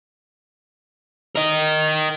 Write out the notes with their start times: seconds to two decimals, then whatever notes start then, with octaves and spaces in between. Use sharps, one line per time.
1.35 A#4 D#5